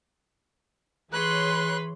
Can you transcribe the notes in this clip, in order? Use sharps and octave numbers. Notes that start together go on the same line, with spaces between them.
E3 G#4 B4 C#5 C6 F#6